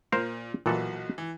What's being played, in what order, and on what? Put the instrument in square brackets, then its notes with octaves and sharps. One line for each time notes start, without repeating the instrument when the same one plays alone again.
[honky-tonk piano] A#2 [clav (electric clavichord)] A#4 C5 F5
[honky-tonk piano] B1 F#4 [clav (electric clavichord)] A#2 E3 A4
[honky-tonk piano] E3